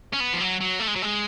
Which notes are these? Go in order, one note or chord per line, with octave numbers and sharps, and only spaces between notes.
C#4
B3
F3
F#3
F#3
A3
G#3
F#3
G#3